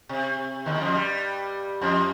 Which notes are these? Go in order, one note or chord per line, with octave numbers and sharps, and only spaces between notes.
C3
D#2 D#3
F2 F3
G2 G3
F2 F3